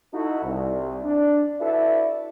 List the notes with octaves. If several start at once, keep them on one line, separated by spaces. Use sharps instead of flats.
D#4 E4 F#4 A4
C2
D4
E4 F#4 A4 B4 D5 E5